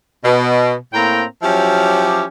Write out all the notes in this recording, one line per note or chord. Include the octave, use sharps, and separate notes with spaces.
B2
A2 A#3 C4 G5 A#5
F3 F#3 C#4 E4 G4